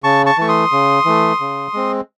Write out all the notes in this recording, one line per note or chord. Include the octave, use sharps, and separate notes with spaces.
C#3 A5 C#6
A5 C#6
E3 A3 C#6
C6 D#6
C#3
E3 A3
C#3
G#3 C4